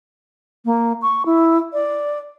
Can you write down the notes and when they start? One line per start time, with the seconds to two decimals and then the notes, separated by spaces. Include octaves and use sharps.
0.65 A#3
1.02 C#6
1.26 E4
1.73 D5